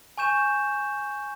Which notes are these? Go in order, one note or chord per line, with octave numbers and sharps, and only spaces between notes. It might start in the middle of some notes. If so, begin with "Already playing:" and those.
G#5 C#6 G6 E7